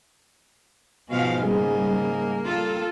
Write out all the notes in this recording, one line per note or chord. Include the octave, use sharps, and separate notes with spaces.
G#2 B2 F3 F#4 D#5 F5 G#5
C#3 G3 A#3 G#4
G3 F4 A4